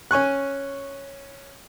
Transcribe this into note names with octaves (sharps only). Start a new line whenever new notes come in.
C#4 G#5 C#6 F#6